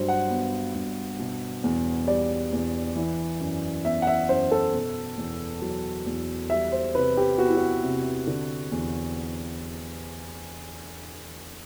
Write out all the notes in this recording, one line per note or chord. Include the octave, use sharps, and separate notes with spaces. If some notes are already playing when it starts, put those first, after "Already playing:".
Already playing: G2 F#3 C5
F#5
B3
G2
B2
E2
G3 D5
E2
E3
F#2
B3 E5
F#5
E5
F#2 C5
A4
B2
E2
F#3
E2
G3 E5
C5
C3 B4
G4
B3 F#4
E4
F#4
C3
D3
E2